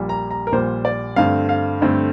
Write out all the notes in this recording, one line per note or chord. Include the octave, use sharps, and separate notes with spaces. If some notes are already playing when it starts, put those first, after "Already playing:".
Already playing: A#1 A#2 G3
A#5
A#5
A#4
A#1 A#2 G3 C5
D5
G2 D3 A3 C4 F5
F5
G2 D3 A3 C4